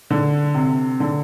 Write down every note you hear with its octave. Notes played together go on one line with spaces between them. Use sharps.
D3
C3
D3